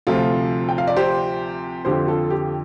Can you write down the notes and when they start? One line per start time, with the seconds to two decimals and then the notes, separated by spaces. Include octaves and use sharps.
0.07 D2 C3 F3 F4 A4
0.69 G5
0.78 F5
0.87 D5
0.96 G4 C5
1.85 F2 D3 F3 G4 C5
2.08 F4 A4
2.30 G4